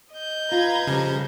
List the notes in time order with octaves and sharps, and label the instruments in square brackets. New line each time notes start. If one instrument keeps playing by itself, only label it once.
[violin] D#5 G6
[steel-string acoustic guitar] F4 [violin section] B4 A#5 G#6
[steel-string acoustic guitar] F2 G3 [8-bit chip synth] C#3